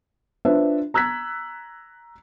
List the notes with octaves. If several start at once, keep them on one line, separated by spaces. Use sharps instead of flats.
D4 F4 B4 C5 E5
A#5 E6 F#6 G#6 B6